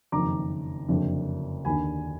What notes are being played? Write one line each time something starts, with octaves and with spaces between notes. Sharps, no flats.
F#1 F2 D#3 A#5 D6
F#1 F2 D3
D#2 D3 G#5 B5